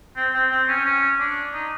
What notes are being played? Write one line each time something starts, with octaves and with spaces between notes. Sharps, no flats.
C4
C4
C4
C#4
C#4
D4
D#4